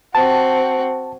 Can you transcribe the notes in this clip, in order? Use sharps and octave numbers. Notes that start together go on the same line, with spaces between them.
C4 F#4 A5